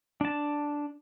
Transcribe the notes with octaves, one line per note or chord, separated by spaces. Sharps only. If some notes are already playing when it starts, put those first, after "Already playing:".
D4 A5